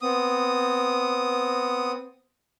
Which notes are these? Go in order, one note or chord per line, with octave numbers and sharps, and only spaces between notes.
B3 C4 D#6